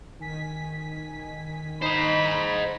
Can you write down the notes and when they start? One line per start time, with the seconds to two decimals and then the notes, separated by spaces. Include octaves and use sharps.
0.19 D#3 G#5 B6
1.82 D#4 C5 D#5 B5